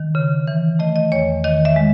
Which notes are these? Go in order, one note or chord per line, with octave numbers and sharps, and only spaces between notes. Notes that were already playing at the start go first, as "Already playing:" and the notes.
Already playing: D#3
C#3
E3
A3 D#5
D#5
E2 C#5
D#3 D#5
E5
G#3